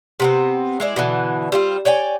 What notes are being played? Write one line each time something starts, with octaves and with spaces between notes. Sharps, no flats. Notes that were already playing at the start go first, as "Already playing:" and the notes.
C3 B3 C4
G#3 E4 D5
B2 D3 E3
G3 C4 F4
C#5 D5 G5 G#5